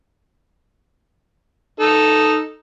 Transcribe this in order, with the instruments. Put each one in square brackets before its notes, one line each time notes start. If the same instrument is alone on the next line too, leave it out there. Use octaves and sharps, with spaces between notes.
[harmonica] D#4 A4